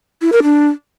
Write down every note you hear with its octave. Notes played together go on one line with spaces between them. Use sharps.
E4
A#4
D4